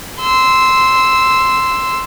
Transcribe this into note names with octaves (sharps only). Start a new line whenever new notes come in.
C6 E6